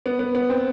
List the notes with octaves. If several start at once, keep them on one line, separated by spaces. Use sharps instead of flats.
B3
B3
B3
C4